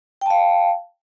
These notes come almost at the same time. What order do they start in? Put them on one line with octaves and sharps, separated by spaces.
G5 A5 F5